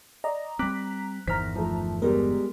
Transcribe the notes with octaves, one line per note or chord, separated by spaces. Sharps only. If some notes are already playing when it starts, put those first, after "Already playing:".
D5 D#5 A#5
G3 C4 A#5 D6 F#6 B6
G1 E2 D#3 C5 A#5 F6 B6
F3 A3
G3 G#3 B3 A#4